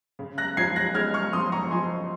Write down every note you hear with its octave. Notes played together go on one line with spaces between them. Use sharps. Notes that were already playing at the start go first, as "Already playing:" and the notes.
C#3
F#6 A#6
F3 G#6 C7
F#6 A#6
G#3 F6 G#6
C#6 F6
F2 C6 D#6
A#5 C#6
F3 G#5 C6